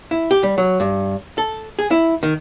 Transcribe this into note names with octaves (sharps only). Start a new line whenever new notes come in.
E4
G4
G3
F#3
G2
A4
G#4
E4
D#3